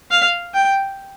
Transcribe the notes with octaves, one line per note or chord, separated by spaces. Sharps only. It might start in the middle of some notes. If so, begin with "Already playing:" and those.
F5
G5